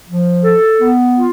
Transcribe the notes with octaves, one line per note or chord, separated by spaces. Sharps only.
F3
A4
B3
F4